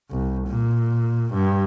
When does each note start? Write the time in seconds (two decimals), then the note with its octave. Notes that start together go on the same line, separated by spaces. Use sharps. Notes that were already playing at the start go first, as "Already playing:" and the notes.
0.11 C2
0.48 A#2
1.33 G2